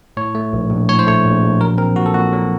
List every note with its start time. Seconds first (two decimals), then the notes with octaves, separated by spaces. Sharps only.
0.17 A2 C#5
0.35 A3
0.53 A#1
0.71 A#1
0.88 A2 C#5
0.99 C5
1.06 A3 C#5
1.25 A#1
1.42 A#1
1.60 F#3 A#4
1.78 C4 A#4
1.96 A#2 F#4
2.06 A4
2.14 A#2 F#4
2.33 F#3